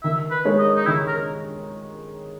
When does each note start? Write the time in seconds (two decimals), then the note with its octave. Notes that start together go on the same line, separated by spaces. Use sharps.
0.03 D#3 E5
0.31 B4
0.45 G#3 D#4 A#4 C#5
0.59 D#5
0.76 D#4
0.86 D#3 E4
1.08 A#4